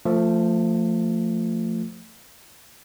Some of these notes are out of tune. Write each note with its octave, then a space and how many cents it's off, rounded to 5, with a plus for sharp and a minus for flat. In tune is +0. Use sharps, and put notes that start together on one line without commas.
F3 +0 A3 +25